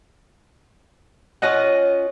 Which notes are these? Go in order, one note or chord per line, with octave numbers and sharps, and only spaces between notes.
C#4 F4 D#5 F#5